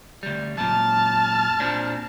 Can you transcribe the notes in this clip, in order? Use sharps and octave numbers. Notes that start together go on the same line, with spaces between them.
D2 G3
F#2 A#2 A5 F6
A#2 C4 D4